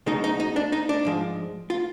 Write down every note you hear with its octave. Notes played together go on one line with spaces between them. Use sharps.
B1 B2 G#3 D#4
D#4
D#4
D4
D#4
D4
G#2 F3 G#3
F4